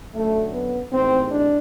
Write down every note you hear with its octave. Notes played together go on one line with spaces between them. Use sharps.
F#2 D3 F#3 A3
B3
A1 G#2 D#3 G#3 C4
D4